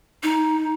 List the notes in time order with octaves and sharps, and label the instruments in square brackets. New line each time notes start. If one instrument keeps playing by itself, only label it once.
[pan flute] D#4